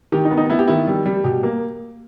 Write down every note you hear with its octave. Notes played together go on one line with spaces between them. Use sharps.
D#3 G4
D#4
B3
D#4
B3 E4
G4
D#3 E4
G3
G3
B2 G4
A#3